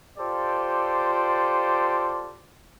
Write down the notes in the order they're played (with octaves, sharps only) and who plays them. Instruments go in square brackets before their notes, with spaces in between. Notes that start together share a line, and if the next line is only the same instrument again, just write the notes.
[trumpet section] F4 G4 A4 C5 D5